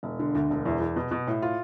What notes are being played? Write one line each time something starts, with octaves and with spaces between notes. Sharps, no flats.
E1
D3
D2
E1
E2
E2
B2
B2
A2
F4